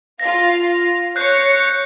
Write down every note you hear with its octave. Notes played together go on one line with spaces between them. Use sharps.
F4 F5 A#6
C#5 F#6 G6 C7 C#7